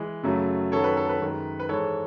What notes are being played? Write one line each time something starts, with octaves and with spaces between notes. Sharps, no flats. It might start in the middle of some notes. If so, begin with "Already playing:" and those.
Already playing: E3 G#3
F#2 C#3 F#3 A3
F#2 D#3 F#3 A4 C#5
B4
A4
B4
F#2 D#3 G#3
B4
G#2 E3 G#3 A4 C#5